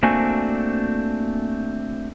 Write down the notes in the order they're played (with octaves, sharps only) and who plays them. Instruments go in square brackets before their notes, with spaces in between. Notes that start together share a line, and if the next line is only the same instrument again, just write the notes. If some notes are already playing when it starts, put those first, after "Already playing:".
[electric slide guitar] A3 A#3 C4 D4 F#4 G#5